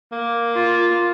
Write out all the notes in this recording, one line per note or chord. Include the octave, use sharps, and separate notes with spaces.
A#3
F4